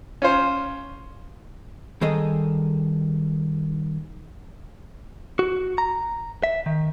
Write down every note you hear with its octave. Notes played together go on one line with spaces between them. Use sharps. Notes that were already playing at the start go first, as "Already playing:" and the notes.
C#4 F4 C5
D#3 G3 G#4 A4 D#5
F#4
A#5
E5
D#3